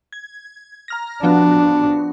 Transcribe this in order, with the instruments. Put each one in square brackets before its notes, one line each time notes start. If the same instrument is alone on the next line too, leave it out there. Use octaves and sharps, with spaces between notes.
[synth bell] G#6
A#5 F6 A#6
[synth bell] F3 B3 F#4 [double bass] D4